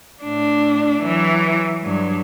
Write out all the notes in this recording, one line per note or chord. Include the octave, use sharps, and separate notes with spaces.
A2 D4
E3 F#3
G2 F#3